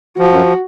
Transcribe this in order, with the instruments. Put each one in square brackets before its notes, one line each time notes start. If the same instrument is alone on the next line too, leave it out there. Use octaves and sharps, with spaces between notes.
[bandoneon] F3 [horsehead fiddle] F#4
[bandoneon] F#2